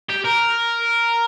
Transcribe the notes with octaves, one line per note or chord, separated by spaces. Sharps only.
G4
A#4